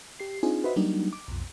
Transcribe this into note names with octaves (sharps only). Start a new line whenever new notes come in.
G4 C7
C4 D4 D#4 F4 G#4 G#5
F#4 B4 C5 D#5 E5 B5
F#3 G3 A#3 D4 D#4
D6
B1 F2